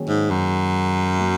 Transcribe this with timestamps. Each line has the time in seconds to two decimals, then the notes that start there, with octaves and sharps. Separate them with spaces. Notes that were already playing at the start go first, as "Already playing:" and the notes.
Already playing: D#3 F#3 A#3 C#4 G#4
0.08 G#2
0.31 F#2
1.19 F#3 A#3 C#4 F#4